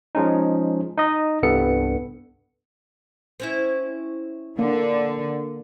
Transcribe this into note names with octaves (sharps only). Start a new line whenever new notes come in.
F3 G#3 C#4 D#4
D#4 D#5
C2 G2 B3 A4 C#7
C4 C#4 E4
D3 A#3